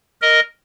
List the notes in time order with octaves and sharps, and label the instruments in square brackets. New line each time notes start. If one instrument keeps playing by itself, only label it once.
[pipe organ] A#4 D#5